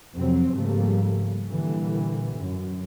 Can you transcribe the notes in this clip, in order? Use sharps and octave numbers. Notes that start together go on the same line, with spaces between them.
F2 C3 F#3 C4
G#2 C#3 F3 G3 A3 A#3
A#2 D3 E3 G3
F#2